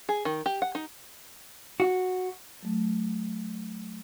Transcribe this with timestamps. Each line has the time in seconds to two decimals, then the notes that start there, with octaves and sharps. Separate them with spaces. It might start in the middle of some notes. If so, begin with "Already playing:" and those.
0.09 G#4
0.25 D#3
0.46 G4
0.62 F#5
0.75 D#4
1.80 F#4
2.63 F#3 A3